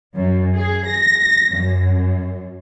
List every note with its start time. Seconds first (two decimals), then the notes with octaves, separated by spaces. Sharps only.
0.15 F#2
0.56 G#4
0.88 A#6
1.54 F#2